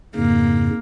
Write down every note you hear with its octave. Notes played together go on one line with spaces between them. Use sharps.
F2 G#2 C#3 A#3